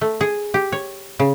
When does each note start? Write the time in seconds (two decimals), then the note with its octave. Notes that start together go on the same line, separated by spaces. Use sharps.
0.01 A3
0.21 G#4
0.54 G4
0.72 C#5
1.19 C#3